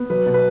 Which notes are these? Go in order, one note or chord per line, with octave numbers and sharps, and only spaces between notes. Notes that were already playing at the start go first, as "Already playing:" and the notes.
Already playing: B3
F#3 B4
B2
B4